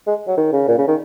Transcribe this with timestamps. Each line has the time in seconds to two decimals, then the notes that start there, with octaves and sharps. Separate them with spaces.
0.07 G#3
0.28 F#3
0.37 D#3
0.52 C#3
0.68 A#2
0.78 C#3
0.88 D#3